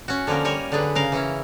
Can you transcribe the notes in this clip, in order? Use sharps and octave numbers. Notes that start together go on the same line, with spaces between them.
C#4 F#4
D3 F3 A#3 C#4 A#4
G3 A#4 C#5 G#5
D3 F#3 D4 G#4 B4
C#3 A#4 F5
E3 C#4 E4